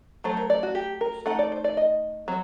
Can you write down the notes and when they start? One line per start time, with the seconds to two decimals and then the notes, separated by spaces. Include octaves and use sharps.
0.24 F#3 A3 C5
0.37 A#4
0.50 D5
0.63 F#4
0.75 G4
1.01 A#4
1.26 A3 D#4 F#5
1.39 D5
1.52 C5
1.64 D5
1.77 D#5
2.28 F#3 C4